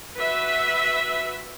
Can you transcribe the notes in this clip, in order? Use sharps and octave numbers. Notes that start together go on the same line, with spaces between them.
F#4 B4 E5